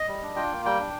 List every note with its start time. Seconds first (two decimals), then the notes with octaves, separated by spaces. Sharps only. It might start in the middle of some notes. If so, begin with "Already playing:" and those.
Already playing: D#5
0.08 G3
0.23 D4
0.36 F4 G5
0.52 A#3
0.65 G3 G5
0.80 D4